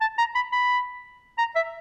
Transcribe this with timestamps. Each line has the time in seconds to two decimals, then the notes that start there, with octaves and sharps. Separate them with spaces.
0.01 A5
0.18 A#5
0.35 B5
0.53 B5
1.38 A#5
1.56 E5